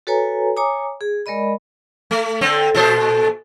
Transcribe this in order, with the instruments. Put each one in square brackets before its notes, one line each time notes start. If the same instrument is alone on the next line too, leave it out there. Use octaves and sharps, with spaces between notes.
[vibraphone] F#4 A4 B4 C#5 G#5 A#5
C#5 G#5 A#5 D6 D#6
G#4
G#3 A#4 D5 D#5 B5
[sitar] A3
D3 C4
A#2 A4 C5